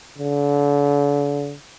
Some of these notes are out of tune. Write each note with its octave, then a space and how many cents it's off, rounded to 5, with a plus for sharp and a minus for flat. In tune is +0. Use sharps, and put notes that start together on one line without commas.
D3 -40